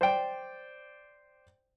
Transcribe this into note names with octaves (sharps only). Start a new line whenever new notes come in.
C5 D5 G5